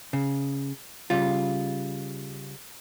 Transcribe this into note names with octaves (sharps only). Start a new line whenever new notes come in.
C#3
C#3 G3 F4